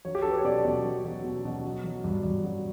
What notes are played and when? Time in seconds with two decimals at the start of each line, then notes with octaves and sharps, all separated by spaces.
0.05 F#3 C#5
0.15 G4
0.22 A4
0.25 F#3 B4
0.38 C#5
0.45 B2 D5
0.65 B2
0.85 F#3
1.05 F#3
1.24 B2
1.45 B2
1.64 F#3
1.84 F#3
2.04 G2
2.24 G2
2.44 F#3